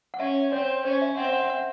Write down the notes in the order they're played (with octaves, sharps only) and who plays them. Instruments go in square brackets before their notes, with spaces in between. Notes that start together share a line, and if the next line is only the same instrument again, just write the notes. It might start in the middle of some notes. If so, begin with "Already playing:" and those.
[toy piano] F#5
[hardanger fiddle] C#4 [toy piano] E5
[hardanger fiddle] C4 [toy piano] C#5
[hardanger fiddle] C#4 [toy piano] C5
[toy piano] E5
[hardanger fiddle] C4 [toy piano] F#5
[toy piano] E5
F#5
E5
F#5